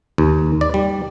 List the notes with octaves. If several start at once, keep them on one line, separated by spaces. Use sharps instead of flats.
D#2
D5
G3